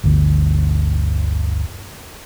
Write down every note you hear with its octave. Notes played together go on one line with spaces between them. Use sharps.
G1 D2